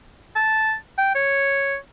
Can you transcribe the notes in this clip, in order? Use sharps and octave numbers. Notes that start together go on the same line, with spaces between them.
A5
G5
C#5